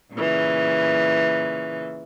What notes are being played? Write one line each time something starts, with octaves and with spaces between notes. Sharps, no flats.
A#2 C#3 E3